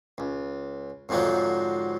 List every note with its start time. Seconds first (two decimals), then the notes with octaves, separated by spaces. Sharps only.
0.18 C#2
1.09 F2 G#2 D3 F3 F#3